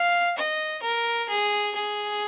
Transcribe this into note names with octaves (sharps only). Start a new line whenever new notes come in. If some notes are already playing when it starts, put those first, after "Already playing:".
Already playing: F5
D#5
A#4
G#4
G#4